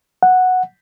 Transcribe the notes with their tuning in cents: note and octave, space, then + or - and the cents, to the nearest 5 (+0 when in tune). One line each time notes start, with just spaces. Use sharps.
F#5 -5